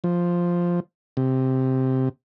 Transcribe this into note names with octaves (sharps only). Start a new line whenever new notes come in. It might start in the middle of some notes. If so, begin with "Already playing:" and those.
F3
C3